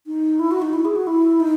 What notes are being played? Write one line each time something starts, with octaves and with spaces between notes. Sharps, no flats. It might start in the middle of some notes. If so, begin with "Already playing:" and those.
D#4
E4
F#4
D#4
E4
G#4
F#4
E4
D#4